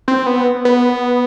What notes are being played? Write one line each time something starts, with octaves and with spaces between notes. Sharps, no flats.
C4
B3
B3